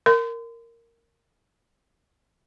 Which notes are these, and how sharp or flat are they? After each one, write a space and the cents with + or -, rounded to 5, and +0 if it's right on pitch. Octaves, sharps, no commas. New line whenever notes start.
A#4 -10 C6 -40